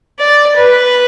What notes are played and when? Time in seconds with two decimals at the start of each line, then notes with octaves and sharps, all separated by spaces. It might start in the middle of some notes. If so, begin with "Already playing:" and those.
0.20 D5
0.57 B4